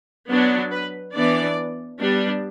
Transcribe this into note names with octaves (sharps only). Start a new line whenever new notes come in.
F#3 B3 D4
B4
E3 B3 D4 D5
G3 B3 D4